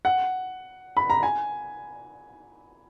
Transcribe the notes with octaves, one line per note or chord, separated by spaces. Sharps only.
F#5
B5
A#5
G#5